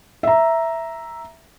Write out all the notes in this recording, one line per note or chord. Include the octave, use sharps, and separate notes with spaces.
E5 A#5